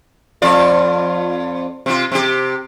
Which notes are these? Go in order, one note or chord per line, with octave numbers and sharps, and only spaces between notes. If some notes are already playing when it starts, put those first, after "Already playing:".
F2 F4 D5
C3 F4
C3 G4